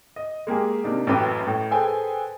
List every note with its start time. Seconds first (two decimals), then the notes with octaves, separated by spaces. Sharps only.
0.16 D#5
0.47 G#3 A#3 G4 G#4
0.84 C3 A#3 D4 D#4
1.07 A1 F#2 A2 B4 G5 D6
1.46 A2
1.71 G#4 A4 B4 C5 G5 G#5